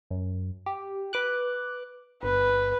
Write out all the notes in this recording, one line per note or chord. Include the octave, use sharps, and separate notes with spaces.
F#2
G4
B4 D6 F#6
G1 B4